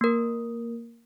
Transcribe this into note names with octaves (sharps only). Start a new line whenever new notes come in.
A#3 A#4